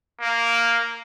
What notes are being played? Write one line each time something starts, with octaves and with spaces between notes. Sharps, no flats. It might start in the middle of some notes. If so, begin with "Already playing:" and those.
A#3